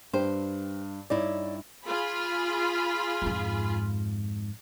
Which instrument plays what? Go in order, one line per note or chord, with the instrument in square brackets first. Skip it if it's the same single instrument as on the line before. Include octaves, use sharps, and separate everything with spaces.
[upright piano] G2 [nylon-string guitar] G4 C5
[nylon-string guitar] G2 D#4 E4 [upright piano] C#5 D5
[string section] F4 G#4 B5
[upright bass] F2 G#2